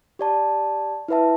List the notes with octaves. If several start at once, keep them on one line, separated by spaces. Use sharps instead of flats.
G4 D5 A5
E4 B4 E5 A5